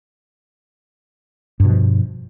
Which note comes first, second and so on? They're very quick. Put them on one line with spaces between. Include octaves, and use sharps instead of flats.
G2 B2 F3